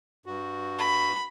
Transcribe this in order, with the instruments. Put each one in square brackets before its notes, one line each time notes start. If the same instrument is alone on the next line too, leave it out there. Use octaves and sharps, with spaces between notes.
[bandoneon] G2 F#4
[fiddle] B5